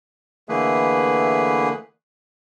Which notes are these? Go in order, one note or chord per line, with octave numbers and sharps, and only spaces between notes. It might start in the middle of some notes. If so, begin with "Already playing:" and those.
D3 E3 A3 A#3 G#4 B4